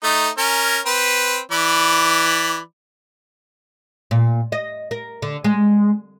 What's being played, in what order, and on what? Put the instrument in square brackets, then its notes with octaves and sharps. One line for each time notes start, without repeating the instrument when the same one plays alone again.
[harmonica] A3 D#4
C#4 A#4
C4 B4
E3 D5 B5
[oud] A#2
D#5
A#4
D3
G#3